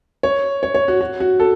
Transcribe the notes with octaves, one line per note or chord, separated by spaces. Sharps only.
C#5
C#5
C#5
F#4
F#4
F#4
A4